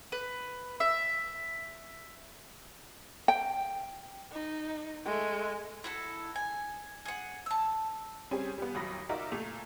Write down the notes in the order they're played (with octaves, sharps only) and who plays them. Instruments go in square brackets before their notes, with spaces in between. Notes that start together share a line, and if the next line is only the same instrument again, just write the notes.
[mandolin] B4
E5
[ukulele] G5
[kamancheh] D#4
G#3 A3
[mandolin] E4 F#4 A4
G#5
G#4 F#5
A5 E6
[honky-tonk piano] G3 C4 C#4 G#4 G#5
G3 B3
A1 D#2 F#3 B5 D#6 A#6
D#4 F4 F#4 A#4 D5 E5
A#2 A3 F7